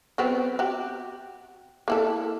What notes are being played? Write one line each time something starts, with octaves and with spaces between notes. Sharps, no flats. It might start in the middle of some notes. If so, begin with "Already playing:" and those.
F#3 B3 C4
F#4 G4
A#3 E4 A4